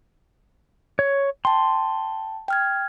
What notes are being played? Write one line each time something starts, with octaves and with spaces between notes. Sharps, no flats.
C#5
G5 A5 C6
G5 F6 G#6